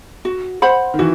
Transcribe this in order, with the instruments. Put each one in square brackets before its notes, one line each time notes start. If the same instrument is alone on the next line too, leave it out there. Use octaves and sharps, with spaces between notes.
[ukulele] F#4
C5 F#5 B5
[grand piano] D#3
[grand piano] E3 [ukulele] F#4